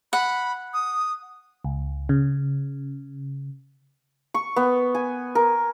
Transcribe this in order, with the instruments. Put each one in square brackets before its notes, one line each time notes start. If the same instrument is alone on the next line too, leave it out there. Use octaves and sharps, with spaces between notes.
[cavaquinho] F#5 [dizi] B5
[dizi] D#6
[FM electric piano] C#2
C#3
[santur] C#6
B3
G#5
A#4